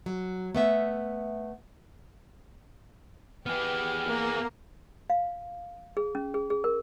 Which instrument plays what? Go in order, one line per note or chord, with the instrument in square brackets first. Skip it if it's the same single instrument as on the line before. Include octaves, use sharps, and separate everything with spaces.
[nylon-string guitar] F#3
A3 B3 E5
[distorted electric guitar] B3 G#4 [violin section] G4 B4 [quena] F6
[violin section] A#3
[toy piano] F5
G#4
C#4
G#4
G#4
A#4